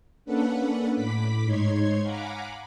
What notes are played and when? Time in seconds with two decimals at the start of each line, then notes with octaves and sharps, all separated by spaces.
0.25 A#3 C#4 D4 A4 B4 F#5
0.93 A2 B5 D6 B6
1.44 G#2 D#4 C#5 C6 G#6
2.02 F5 F#5 G#5 A#5 B5 D6